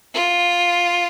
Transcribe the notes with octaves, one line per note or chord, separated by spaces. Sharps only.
F4